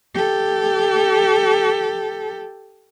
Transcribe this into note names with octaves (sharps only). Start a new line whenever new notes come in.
G4 A4